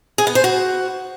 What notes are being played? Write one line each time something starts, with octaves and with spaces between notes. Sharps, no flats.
G#4
B3
C5
F#4